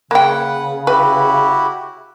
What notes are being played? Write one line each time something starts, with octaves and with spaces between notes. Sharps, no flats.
C#3 A#3 B4 F#5 G5
E4 F#4 G4 B4